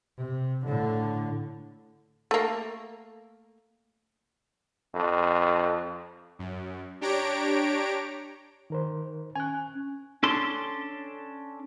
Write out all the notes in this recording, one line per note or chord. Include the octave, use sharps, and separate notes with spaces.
C3
A2 D3
A3 A#3
F2
F#2
D4 G4 C#5 A#5 D7
D#3 A#4 C5
C#4 G#5 F#6
C#4 D4 A4 C6